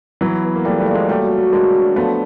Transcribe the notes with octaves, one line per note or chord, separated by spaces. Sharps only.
E3 F#3 B3
B3
A#3
A#2 G3 A3
G3 A3
A#2
G#3 A#3
F#3 G3 A3
F#3
G#3 A#3 D4
F#3
F3 A3 B3